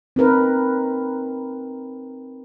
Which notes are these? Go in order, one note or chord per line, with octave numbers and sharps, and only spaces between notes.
C4 D#4 A#4 B4